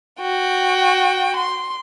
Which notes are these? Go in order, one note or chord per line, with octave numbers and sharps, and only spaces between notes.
F#4 G5
C6